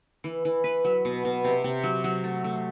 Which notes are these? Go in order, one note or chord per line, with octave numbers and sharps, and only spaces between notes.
E3
E3
B4
F#3
B2
B2
C3
C3
F#3
F#3
A3
A3